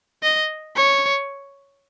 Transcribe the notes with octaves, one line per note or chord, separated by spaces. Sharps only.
D#5
C#5